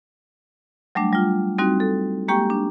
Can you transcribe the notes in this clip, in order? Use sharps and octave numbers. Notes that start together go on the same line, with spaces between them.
F#3 G3 A3 D4
G3 F4
G3 C4 D#4 F#4
A4
G#3 A#3 G4 G5 C#6
D4